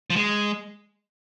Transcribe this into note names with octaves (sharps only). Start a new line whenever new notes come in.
F3
G#3